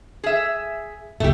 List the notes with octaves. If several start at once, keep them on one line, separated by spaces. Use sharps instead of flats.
G#4 E5
D1 C#2 A#2 A3 G4